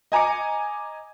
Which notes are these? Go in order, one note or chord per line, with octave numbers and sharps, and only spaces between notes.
D#5 G#5 A#5 D6 C#7